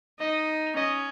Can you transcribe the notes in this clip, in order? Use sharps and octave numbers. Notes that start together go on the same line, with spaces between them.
D#4 D#5
C#4 D#5